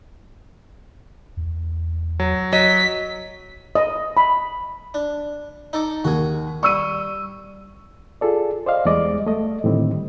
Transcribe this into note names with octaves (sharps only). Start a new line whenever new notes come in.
E2
F#3
F#3 D#5 B6
D#5
B5
D4
D#4 A4 D6
D#2 F#4 G#4
G3 C#6 E6 D#7
F4 G#4 A4 D5
C5 D5 D#5 F5
E2 G3 G#3 D5 D#5 D6
A3 D#5
A2 D3 D#3 G3 C4